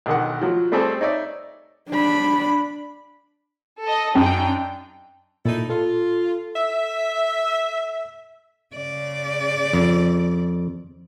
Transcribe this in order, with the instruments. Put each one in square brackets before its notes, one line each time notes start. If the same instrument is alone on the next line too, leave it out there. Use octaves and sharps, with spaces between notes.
[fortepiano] B1 D3 D#3 F#5
F3 F#3
G3 A3 C4 G#4 A4 C5
D#4 C#5 D5 E5
[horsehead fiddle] D4 B5
[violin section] A4 D#5
[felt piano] F#2 [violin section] D4 D#4 G5
[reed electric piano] A#2 [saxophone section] D#4 E4 A4
[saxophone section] F4 [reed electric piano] A4
[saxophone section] E5
[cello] C#3 D5
[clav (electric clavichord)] F2